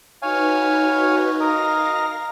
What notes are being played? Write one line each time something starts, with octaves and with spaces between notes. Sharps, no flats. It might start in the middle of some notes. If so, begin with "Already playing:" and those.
D#4 F#4 B4 C#5 F5 G#5
A#4 D#5 F5 A#6